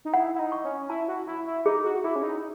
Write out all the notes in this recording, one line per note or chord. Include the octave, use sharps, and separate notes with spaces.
D#4
E4 F#5
E4
D#4
C#6
C#4
E4 A5
F#4
E4 C#6
E4
D#4 G#4
F#4
E4 G#4
C#4
D#4